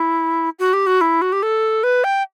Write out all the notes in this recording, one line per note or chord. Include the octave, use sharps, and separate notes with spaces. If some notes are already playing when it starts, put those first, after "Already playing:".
Already playing: E4
F#4
G4
F#4
E4
F#4
G4
A4
B4
G5